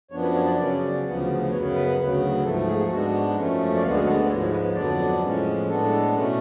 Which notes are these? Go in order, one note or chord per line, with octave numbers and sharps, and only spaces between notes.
F#2 F3 B3 D4 C#5
B4
C#5
D5
C#3 F#3 C#4 D5
D2 C#3 F3 B3
F#2 C#3 F#3 B3 C#5
B4
D2 C#3 F#3 B3
G#2 F3 A3 A4
G#4
G#2 G#3 B3 D4 F#4
F#2 F3 A3 C#4
D5
D2 D3 G#3 B3 F5
G#4
A4
D5
G#2 F3 G#3 C#5
C#5
B4
C#5
F2 D3 F#3 B3 D4 D5
A2 F3 G#3 C#4
A2 G#3 B3 D4 A4
B2 A3 C#4